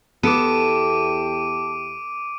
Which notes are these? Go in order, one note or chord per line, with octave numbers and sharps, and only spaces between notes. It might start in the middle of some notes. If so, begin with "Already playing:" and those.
E2 B3 E4 G4 A4 D6 D7 D#7